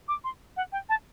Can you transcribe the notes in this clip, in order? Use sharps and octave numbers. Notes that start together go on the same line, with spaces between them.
D6
C6
F#5
G5
A5